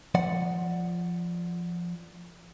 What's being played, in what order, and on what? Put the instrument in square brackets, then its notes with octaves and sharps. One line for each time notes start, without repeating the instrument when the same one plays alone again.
[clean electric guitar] F3 D5 F#5